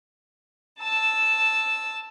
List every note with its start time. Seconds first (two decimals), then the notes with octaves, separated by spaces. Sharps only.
0.81 A5 E6